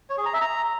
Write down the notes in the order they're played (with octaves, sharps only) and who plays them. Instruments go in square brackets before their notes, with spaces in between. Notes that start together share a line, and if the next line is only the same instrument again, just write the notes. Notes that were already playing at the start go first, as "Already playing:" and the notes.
[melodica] C#5
G#4
A#5
E5
A#5